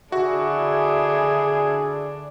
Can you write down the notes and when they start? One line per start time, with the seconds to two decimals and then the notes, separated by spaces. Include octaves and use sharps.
0.12 D3 D4 E4 F#4 G#4